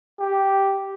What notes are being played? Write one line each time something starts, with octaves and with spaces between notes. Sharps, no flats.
G4